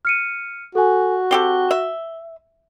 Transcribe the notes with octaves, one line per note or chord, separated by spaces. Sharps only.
F6 C#7 D#7
F#4 A4 G#5
C4 G4 A4 G7
E5